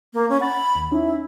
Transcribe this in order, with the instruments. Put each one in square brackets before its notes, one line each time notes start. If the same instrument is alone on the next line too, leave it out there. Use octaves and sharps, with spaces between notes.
[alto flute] A#3
C#4
[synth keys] F#5 A6 [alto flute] B5
[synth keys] D#2
[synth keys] C#4 D#4 [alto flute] E4